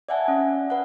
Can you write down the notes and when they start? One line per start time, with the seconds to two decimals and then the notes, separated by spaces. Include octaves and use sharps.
0.09 D5 E5 F#5 G#5 A5
0.28 C#4
0.70 B4 F#5